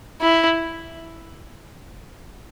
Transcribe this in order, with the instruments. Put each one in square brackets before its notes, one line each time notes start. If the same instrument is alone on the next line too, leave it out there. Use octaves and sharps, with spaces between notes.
[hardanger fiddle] E4